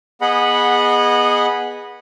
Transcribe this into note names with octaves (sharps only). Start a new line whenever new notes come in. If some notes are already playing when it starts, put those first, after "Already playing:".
B3 G#4 D#5 F#5 B5